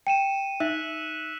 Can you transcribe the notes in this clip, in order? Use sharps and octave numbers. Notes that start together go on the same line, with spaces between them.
G5 C#7 D#7 E7
D#4 E5 E6 F#6 B6